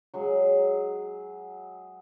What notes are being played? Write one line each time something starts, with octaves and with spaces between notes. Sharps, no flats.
F#3 G#3 G#4